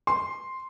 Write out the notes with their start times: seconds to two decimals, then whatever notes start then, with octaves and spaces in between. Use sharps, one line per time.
0.07 C6